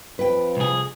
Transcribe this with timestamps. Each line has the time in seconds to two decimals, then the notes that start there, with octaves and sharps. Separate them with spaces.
0.19 F2 B4 G5
0.57 C2 G#4